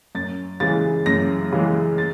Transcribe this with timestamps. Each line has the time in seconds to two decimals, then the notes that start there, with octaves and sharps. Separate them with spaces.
0.15 F#2 A6
0.60 C#3 E3 G#3 A6
1.06 F#2 A#6
1.53 C#3 E3 G#3
1.98 A6